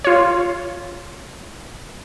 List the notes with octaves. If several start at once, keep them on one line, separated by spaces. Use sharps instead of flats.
F4 C#5